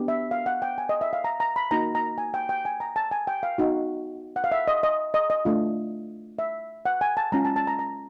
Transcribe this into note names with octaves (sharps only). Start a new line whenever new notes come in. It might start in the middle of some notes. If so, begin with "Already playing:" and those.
Already playing: B3 D4 G4
E5
F5
F#5
G5
G#5
D#5
E5
F5
A#5
A#5
B5
A#3 D#4 F#4 A#5
A#5
G#5
G5
G5
G#5
A#5
A5
G#5
G5
F5
B3 D#4 F#4
F#5
F5
E5
D#5
D#5
D#5
D#5
A3 D4 F4
E5
F#5
G#5
A5
G#3 C#4 F4 A#5
A5
A5
A#5
A#5